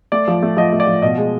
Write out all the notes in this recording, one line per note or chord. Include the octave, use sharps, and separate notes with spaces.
A3 D5
F3
A3
F3 D#5
A3
D5
F3
B2 D#5
G#3